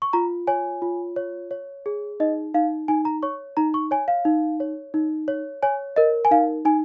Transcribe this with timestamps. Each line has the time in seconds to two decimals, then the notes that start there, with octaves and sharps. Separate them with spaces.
0.02 C#6
0.13 F4 A#5
0.47 C#5 G#5
0.82 F4
1.16 C#5
1.51 C#5
1.86 G#4
2.20 D#4 D#5
2.54 D#4 F5
2.88 D#4 G#5
3.05 A#5
3.23 C#5 C#6
3.57 D#4 A#5
3.74 C#6
3.91 C#5 G#5
4.08 F5
4.25 D#4
4.60 C#5
4.94 D#4
5.28 C#5
5.62 C#5 G#5
5.96 A#4 D#5
6.25 G#5
6.31 D#4 F5
6.65 D#4 G#5